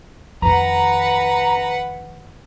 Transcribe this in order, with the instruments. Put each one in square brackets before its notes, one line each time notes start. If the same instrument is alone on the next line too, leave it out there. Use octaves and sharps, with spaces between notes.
[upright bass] F2 D#3 [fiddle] B4 F#5 [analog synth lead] A#5